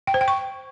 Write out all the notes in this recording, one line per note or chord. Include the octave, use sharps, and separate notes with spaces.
G5
C5
G5
C#6